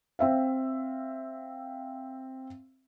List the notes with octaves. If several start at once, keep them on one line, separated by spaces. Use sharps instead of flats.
C4 E5 F5